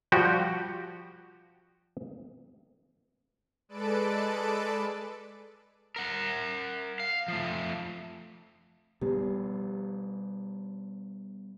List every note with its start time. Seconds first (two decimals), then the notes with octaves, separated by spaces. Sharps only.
0.12 F3 G3 F#4 G4
3.69 G#3 A4 B4 D5 A5 D7
5.96 A#4 F#5
7.00 F5
7.28 F3 A3
9.02 B2 G3 B3 G4